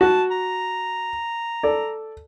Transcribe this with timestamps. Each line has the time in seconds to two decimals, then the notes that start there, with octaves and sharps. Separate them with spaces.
0.01 F#4 A5
0.31 A#5
1.63 A4 D5